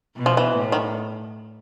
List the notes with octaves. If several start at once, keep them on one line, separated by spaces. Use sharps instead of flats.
B2
F3
E3
A2
D#3